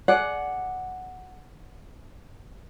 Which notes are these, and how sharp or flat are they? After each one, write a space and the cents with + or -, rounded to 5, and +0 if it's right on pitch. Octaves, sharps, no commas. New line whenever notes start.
G#4 +25 D5 +0 F#5 +0